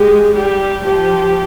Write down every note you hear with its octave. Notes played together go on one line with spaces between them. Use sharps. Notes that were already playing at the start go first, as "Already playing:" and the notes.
Already playing: G#3 G4
G3 G4
F3 G4